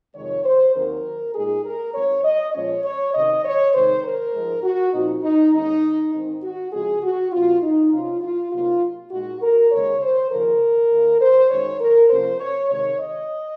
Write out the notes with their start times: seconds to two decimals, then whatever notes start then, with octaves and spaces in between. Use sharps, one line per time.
0.15 F2 C3 D#3 G#3 C#5
0.45 C5
0.75 D#2 D#3 F#3 C4 D#4 A#4
1.35 A#2 G#3 D#4 G#4
1.65 A#4
1.94 G#2 F#3 C4 C#5
2.24 D#5
2.54 A#2 F3 G#3 C#4 C#5
2.84 C#5
3.14 C3 D#3 F#3 C#4 D#5
3.45 C#5
3.74 C3 D#3 G#3 D#4 C5
4.04 A#4
4.34 G#2 F3 G#3
4.63 F#4
4.93 A#2 F3 C4 D#4
5.23 D#4
5.54 D#2 D#3 G#3 C#4 D#4
6.13 G#2 D#3 G#3 C4 D#4
6.43 F#4
6.72 C#3 F3 G#3 C4 G#4
7.03 F#4
7.32 A#2 F3 C4 F4
7.62 D#4
7.92 C3 F#3 C#4 F4
8.22 F4
8.52 C3 F#3 A#3 D#4 F4
9.11 A#2 G#3 D#4 F#4
9.42 A#4
9.71 D#2 C#3 G#3 C#5
10.01 C5
10.31 D#2 C#3 F3 A#4
10.91 D#2 D#3 A#3
11.21 C5
11.50 F#2 D#3 G#3 C#5
11.80 A#4
12.10 C3 F3 A#3 C#4 C5
12.40 C#5
12.70 C3 D#3 G#3 C#5
12.99 D#5